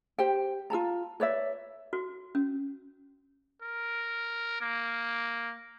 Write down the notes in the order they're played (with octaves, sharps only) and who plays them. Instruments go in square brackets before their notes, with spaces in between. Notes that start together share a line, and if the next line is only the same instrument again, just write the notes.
[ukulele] G4 C5 G5
F4 A4 A5 A#5
B4 C#5 D5 E5
[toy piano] F#4
C#4
[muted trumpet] A#4
A#3